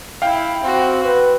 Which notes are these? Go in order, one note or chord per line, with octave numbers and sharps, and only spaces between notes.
E4 F5 G5
C4 F#4
B4